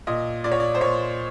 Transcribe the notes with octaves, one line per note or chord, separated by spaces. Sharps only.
A#2 D#5
A#2 D5
C#5
D5
C5
A#2 C#5